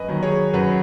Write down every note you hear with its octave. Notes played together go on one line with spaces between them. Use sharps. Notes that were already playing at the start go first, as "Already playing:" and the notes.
Already playing: F#2 B4 D#5 G#5
D#3 F#3
G#4 C#5
F#2 F#4 B4